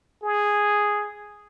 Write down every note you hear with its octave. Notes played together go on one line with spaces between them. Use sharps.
G#4